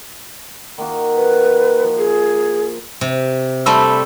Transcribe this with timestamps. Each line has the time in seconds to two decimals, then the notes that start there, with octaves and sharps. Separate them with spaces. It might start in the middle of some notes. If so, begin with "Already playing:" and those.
0.78 D#3 A#3 F#4
1.16 B4
1.83 F3
1.99 G#4
3.01 C3
3.66 G3 A3 C4 A5 B5 E6